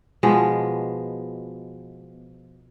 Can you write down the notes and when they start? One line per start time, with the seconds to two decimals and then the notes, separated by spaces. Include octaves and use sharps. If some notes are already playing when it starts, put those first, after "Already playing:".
0.23 B2 F3 G#3 B3